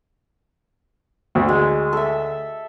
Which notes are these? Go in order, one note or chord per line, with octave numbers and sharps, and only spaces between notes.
D2
G#3
A4 E5